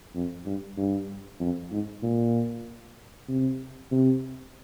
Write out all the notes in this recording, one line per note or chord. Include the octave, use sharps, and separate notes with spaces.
F2
G2
G2
F2
G#2
A#2
C3
C3